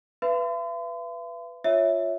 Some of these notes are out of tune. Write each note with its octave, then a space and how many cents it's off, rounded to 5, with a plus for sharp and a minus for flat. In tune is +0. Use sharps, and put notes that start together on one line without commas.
B4 +0 E5 +45 C6 -45
F4 +10 C#5 +0 E5 -10